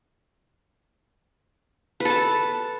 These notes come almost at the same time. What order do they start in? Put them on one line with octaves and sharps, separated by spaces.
B4 A4 A5